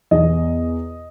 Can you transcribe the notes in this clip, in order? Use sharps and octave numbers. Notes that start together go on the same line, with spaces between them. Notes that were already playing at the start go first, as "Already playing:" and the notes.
E2 B2 D#5